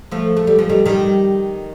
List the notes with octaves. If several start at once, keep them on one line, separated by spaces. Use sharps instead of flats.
F3 A3
A3
G3
F3
D#3 G3
D#3 G3